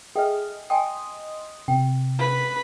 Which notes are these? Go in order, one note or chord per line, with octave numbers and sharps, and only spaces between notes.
G#4 A4 D#5 E5 G5 F6
D#5 G5 G#5 C6 D#6
C3 G5
B4 B5